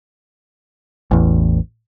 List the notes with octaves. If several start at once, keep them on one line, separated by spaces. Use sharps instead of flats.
A1 E2